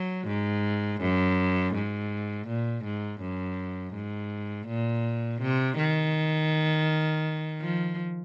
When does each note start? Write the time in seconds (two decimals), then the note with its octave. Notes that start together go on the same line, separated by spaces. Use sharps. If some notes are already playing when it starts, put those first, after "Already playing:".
Already playing: F#3
0.27 G#2
1.01 F#2
1.74 G#2
2.48 A#2
2.84 G#2
3.21 F#2
3.94 G#2
4.67 A#2
5.42 C3
5.78 D#3
7.61 F3